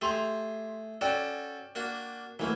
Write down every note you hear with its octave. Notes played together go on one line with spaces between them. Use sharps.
A3 G4 G#4 C6 F7
C#4 F#4 A4 D5 G5
A#3 D4 F#4
E3 F#3 A3 A#3